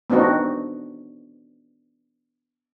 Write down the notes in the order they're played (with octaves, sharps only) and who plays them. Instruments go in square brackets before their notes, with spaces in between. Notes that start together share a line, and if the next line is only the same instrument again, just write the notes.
[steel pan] B3 C4 D4 D#4 F#4